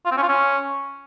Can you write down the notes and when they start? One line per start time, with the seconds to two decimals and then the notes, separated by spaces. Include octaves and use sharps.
0.06 F4
0.11 C4
0.17 C#4
0.23 F4
0.28 C#4